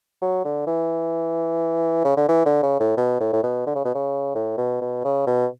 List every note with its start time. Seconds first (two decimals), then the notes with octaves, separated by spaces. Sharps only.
0.21 F#3
0.44 D3
0.67 E3
2.04 C#3
2.17 D3
2.28 E3
2.46 D3
2.62 C#3
2.80 A2
2.97 B2
3.20 A2
3.33 A2
3.43 B2
3.67 D3
3.75 C#3
3.85 B2
3.95 C#3
4.35 A2
4.57 B2
4.81 B2
5.04 C#3
5.26 B2